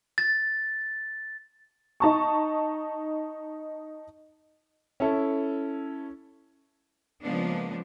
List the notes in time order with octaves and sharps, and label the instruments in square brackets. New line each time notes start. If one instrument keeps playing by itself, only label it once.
[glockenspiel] A6
[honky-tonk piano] D#4 A5 C#6
[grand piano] C#4 E4 A4
[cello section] C#3 F3 G#3 A#3 B3 D4